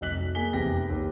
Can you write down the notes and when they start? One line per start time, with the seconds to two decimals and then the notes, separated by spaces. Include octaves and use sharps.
0.01 F1 F#3 D#5 F#6 B6 F#7
0.35 A#3 G#4 G#5 B6 G7
0.53 F1 E2 C3 G4 G5 A#6
0.90 D#2 G4